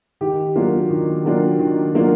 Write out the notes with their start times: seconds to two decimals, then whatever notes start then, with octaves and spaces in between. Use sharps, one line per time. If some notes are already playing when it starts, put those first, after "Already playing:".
0.21 D#3 G4
0.56 F#3 A#3 D4 F4
0.90 D#3
1.25 F#3 A#3 D4 F4
1.59 D#3
1.94 F#3 A#3 D4 F4